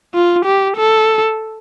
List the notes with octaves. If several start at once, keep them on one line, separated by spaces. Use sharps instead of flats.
F4
G4
A4